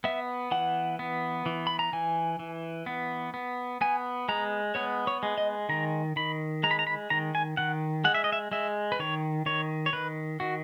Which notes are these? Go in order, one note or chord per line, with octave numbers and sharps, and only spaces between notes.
B3 E5
E3 F#5
B3
E3
B5
A#5
E3 G#5
E3
B3
B3
B3 G#5
G#3 A#5
B3 C#5
C#5
G#3
D#5
D#3 A#5
D#3 B5
G#3 A#5
B5
A#5
B5
D#3 A#5
G#5
D#3 F#5
G#3 F#5
E5
D#5
E5
G#3 E5
B4
D#3 C#5
D#3 C#5
C#5
D#3 B4
D#3 F#4